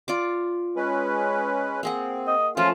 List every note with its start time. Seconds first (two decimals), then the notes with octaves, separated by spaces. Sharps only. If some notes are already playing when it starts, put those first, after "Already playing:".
0.08 F4 D5 D6
0.76 G#3 C#4 B4
1.83 A#3 C4 G#4 F#5
2.28 D#5
2.57 F3 A3 C#4 F4